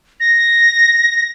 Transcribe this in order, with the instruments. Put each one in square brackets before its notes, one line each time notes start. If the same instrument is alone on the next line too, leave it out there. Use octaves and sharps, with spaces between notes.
[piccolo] A#6